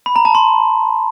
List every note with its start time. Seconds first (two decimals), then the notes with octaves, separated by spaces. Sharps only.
0.06 B5
0.16 A#5
0.25 A5
0.35 C6